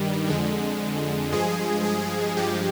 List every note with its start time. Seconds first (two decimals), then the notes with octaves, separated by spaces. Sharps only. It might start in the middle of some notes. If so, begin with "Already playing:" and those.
Already playing: G2 D#3 G3
0.28 F2 D3 G#3
1.32 G2 F3 G#3 G#4
1.85 G#4
2.37 G2 F3 G#3 G4